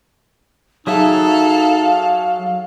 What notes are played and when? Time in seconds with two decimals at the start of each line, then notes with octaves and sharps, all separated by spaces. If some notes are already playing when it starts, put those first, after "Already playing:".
0.87 F#3 D#4 G#4 A4 E5 F5